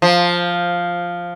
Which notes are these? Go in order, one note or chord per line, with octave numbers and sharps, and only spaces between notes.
F3